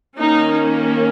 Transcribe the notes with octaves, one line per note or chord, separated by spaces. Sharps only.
D#3 A#3 C#4 D#4